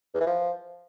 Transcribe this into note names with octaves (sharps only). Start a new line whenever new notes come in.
E2
E3
F3